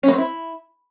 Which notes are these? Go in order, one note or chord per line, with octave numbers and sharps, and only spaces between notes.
C#4
A#3
C4
E4